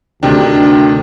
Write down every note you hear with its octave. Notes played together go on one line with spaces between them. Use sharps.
D2 C3 D#3 D4 G5